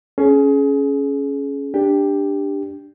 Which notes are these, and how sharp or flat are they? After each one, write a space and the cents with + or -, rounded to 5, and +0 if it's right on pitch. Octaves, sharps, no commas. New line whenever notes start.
C#4 +0 G#4 +25
D4 +0 G4 +10